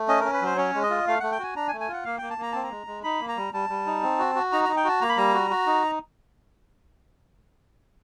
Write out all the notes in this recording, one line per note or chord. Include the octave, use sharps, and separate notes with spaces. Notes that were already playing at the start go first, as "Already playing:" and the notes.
Already playing: A3
C#4 D#5
C#4 A#4
B4
F#3 C5
C#4 C#5
G#3
D#5
F4
A3 F5
A3 F#5
G5
F#4 G#5
D4 A#5
G#5
A3
G#5
F4 F#5
A#3 F5
A#3 G5
A5
A#3 A#5
C4 A5
A#5
G#3
G#3
D#4 B5
A#3
A#5
G3
G3 A5
G3
D#4
C4
F#4
F#4
D#4 A#5
D#4 A#5
G5
F#4 A5
A#3 A#5
B5
G3 A#5
F#4
F#4
D#4